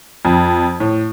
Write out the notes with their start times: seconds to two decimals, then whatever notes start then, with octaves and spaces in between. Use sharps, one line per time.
0.25 F2
0.80 A2